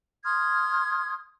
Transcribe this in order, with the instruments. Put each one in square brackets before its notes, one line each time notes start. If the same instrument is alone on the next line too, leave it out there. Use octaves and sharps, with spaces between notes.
[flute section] C6 D#6 F6 G#6